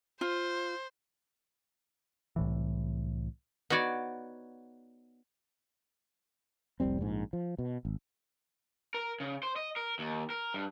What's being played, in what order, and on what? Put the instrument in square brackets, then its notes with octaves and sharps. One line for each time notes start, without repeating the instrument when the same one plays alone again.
[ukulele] F4 [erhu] C5
[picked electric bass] C2 A2 E3
[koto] B3 D#4 F#4 C#5 D5
[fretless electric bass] F1 C2 G3 C4
A#1 G#2
F3
B2
G#1
[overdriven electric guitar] A#4
C#3
C5
D#5
A#4
D#2
A#4
G2